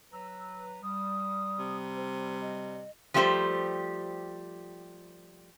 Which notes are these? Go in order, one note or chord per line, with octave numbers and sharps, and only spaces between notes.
F#3 B4 A#5 E6
G3 D#6
C3
C5
D#5
F3 G3 A3 F#4 G4 C5